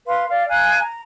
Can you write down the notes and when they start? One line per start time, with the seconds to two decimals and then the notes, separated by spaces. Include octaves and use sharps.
0.06 B4 F5 C6
0.29 D5 F5
0.49 F5 G#5 A#5 F#6
0.79 A#5